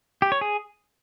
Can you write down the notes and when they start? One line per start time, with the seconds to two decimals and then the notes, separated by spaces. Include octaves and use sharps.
0.22 G4
0.32 C#5
0.41 G#4